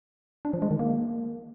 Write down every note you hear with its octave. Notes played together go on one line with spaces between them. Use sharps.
D4
F3
G#3
D#3
A#3